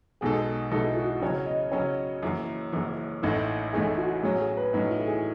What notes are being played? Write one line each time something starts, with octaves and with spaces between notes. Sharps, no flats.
B1 B2 G#3 D#4 G#4 A4
B1 B2 G#3 D#4 E4 A4
F#4
C#3 F#3 C#4 C#5
D#5
C#3 F#3 C#4 C#5
F#1 F#2 E3
F#1 F#2 E3
A1 A2 E3 A3 D#4
A1 A2 E3 A3 D#4 G#4
F#4
A2 F#3 C#4 G#4
G#4
B4
A2 F#3 C#4 D#4
E4
A4
G#4